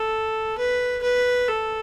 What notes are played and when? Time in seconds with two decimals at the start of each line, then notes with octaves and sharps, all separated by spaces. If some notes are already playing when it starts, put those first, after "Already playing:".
Already playing: A4
0.58 B4
1.02 B4
1.47 A4